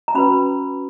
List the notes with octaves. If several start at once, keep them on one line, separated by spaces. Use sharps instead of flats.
A#5
C#4 F#4 B4 B5